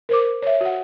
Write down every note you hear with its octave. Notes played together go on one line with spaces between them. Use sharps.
A#4 C5 D6
C#5 E5
F#4 F#5